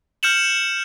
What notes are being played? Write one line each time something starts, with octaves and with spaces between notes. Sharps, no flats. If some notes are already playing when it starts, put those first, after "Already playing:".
F6 G6 C#7 E7 F#7